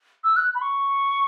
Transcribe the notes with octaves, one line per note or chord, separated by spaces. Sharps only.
E6
F#6
B5
C#6